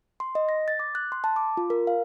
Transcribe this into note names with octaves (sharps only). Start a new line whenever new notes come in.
C6
D#5
A#6
A6
D6
F#6
C6
A5
D6
F4
A#4
F5